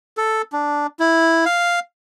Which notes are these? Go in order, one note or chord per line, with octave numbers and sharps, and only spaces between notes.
A4
D4
E4
F5